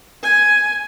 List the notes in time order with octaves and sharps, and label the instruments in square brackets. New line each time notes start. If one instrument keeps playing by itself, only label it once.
[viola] G#5